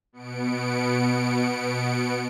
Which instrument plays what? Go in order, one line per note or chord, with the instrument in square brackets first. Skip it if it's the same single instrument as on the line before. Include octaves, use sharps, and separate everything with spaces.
[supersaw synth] B2 B3 C#7 D7